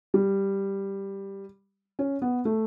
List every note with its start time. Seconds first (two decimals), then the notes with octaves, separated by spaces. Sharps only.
0.14 G3
1.99 C#4
2.22 B3
2.45 A3